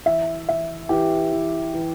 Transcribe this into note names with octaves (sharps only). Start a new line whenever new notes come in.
E3 E5
E3 E5
E3 G4
E3
E3